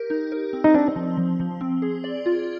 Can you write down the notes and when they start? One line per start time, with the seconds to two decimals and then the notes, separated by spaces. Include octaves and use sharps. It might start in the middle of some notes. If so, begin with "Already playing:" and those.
Already playing: G4 A#4
0.10 D#4
0.32 A#4
0.53 C4
0.64 D#4
0.74 C4 D4
0.96 F3
1.17 F3
1.40 F3
1.61 C4
1.82 G#4
2.04 D5
2.26 F4